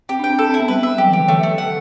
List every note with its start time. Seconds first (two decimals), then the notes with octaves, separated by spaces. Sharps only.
0.09 C4 G4
0.19 D4
0.24 G5
0.29 C4
0.39 D4 A4
0.49 C4
0.54 E4
0.59 B3
0.68 G3 B4
0.83 E5
0.98 F#3 G4
1.08 E3
1.13 G4
1.19 D3
1.28 E3 A3
1.43 A3
1.58 F#5